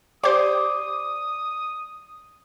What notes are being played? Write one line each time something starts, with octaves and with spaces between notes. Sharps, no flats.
G4 C5 D5 D6 D#6